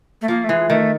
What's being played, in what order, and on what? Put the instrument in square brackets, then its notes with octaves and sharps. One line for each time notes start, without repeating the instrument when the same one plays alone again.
[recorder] A3
[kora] F3 [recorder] A#3
[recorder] A3
[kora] E3 [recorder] G#3
[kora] D#3 [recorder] A3